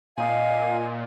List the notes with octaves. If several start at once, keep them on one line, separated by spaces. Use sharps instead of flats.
A#2 C4 D#4 F4 F5 G#5